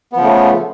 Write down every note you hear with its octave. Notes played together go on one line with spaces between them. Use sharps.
C#3 F3 A3 B3